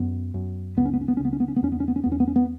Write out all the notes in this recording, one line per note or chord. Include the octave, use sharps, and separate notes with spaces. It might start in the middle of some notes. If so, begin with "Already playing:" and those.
Already playing: F#2 B3
F#2
C#2 B3
C#4
B3
C#4
B3
C#2 C#4
B3
C#4
B3
C#4
B3
E2 C#4
B3
C#4
B3
C#4
E2 B3
C#4
B3
C#4
B3